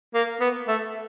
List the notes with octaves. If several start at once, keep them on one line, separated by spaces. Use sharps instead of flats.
A#3
B3
A3